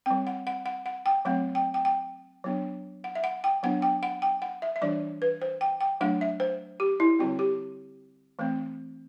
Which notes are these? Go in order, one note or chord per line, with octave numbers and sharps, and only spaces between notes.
G3 C4 G5
F#5
F#5
F#5
F#5
G5
F#3 A3 C4 F#5
G5
G5
G5
F#3 B3 D4
F#5
E5
F#5
G5
F#3 B3 D4 F#5
G5
F#5
G5
F#5
E5
E5
E3 G3 D4 D5
B4
C5
G5
G5
F#3 A3 D4 F#5
E5
C5
G4
E4
D3 G3 C4 F#4
G4
E3 A3 C4